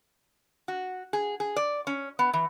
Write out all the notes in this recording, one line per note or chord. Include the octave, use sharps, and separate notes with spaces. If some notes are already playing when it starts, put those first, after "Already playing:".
F#4
G#4
G#4
D5
C#4
B3
E3